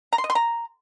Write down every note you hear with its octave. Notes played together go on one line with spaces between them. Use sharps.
A#5
C6
D#5
C6
A#5